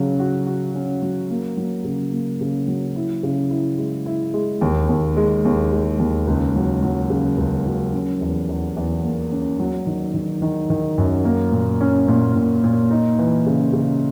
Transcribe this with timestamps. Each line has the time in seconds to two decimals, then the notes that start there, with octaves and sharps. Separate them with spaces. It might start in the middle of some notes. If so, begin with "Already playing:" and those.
Already playing: C#3 F#3
0.20 F#4
0.46 F#4
0.75 C#4
1.02 F#3
1.30 A#3
1.57 F#3
1.85 C#3
2.12 A#3
2.41 C#3
2.68 F#3
2.96 E4
3.23 C#3
3.51 E4
3.78 G#3
4.06 E4
4.34 G#3
4.61 D#2
4.89 D#2
5.17 G#3
5.45 D#2
5.72 G#3
5.99 D#2
6.27 C#2
6.56 F#3
6.83 F#3
7.10 C#3
7.38 C#2
7.66 F#3
7.93 C#4
8.21 E2
8.49 E2
8.76 E2
9.03 A#3
9.32 C#4
9.59 F#3
9.86 D#3
10.14 D#3
10.42 D#3
10.70 D#3
10.98 F#2
11.25 A#3
11.52 A#2
11.81 C#4
12.08 A#2
12.35 A#2
12.64 A#2
12.91 D#4
13.19 E3
13.46 C#3
13.73 C#3